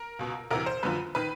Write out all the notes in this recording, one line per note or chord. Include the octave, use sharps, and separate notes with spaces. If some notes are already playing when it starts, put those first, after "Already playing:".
Already playing: A#4
C#2 B2
D2 C3 E3 A#4
C5
F#2 D3 F3 B4
D#3 B4